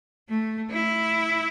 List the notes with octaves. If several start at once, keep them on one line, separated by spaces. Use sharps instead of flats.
A3
E4